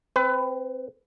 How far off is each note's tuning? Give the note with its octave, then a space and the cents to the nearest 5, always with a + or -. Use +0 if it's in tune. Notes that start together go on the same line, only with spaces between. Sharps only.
C4 +0 B4 +25